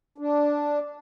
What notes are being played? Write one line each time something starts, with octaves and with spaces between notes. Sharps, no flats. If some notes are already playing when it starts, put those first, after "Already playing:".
D4